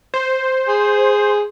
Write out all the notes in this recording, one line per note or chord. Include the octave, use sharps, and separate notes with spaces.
C5
G#4